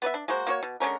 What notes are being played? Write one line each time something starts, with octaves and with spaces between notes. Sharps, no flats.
B3 B4 D5 E5
D4
G#3 A#3 F#4 C5
A#3 F#4 C#5
B2
D3 G#3 C#4 A#4